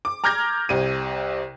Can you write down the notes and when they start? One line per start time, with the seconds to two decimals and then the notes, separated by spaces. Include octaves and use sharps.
0.05 D6
0.24 A#5 D6 F6 G6 G#6 A#6
0.69 C2 C3 D#7